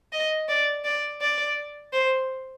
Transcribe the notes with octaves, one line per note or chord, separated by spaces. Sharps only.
D#5
D5
D5
D5
C5